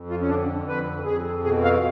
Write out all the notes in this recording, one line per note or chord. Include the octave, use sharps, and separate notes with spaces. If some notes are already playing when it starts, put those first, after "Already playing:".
Already playing: F2
F4
C#4
D3 D4
F2 B4
F2 G#4
B2 G#4
F5